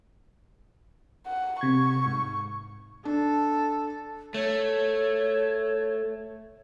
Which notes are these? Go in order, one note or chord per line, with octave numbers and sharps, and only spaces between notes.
F#5
C3 C#6 G#6
G#2
D4 A4
A3 C#5